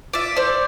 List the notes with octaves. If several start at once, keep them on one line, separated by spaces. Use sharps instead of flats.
F4 D5 E5
A4 C5 D5